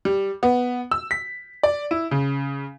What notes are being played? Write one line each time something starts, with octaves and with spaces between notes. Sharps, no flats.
G3
B3
E6
B6
D5
E4
C#3